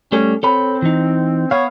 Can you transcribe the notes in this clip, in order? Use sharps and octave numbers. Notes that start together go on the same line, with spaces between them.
G3 A3 C#4 A4
C4 A4 C#5 B5
E3 D#4
B3 C#5 F5